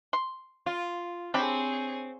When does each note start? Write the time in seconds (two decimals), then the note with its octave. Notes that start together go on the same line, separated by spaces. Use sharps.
0.13 C6
0.66 F4
1.34 C4 D4 G4 G#4 C#5 B5